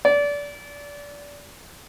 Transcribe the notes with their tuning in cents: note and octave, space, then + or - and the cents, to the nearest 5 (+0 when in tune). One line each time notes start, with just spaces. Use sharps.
D5 -25